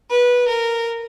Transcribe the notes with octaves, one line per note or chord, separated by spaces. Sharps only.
B4
A#4